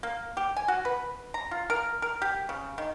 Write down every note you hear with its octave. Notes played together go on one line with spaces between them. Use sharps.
A#3
G4
G#5
F#4
B4
A#5
F4
A#4
A#4
G4
C#3
D#3